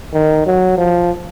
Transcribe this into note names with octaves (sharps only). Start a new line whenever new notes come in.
D#3
F#3
F3